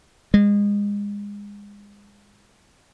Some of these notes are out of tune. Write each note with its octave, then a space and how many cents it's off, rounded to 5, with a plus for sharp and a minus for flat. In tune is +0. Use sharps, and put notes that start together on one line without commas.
G#3 -30